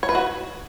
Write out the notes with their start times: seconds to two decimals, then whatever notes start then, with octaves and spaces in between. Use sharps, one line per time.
0.03 C#5
0.09 B4
0.15 F#4